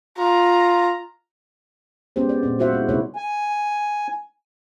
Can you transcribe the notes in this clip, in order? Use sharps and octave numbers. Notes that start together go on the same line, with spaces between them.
F4 A#5
G#3 B3 C#4 G4 C5
D5
A#2 C4
G#3 F4 F#4 C5 E5 F#5
G#3 E4
C3 A3 D#4 E4 B4 C#5
G#5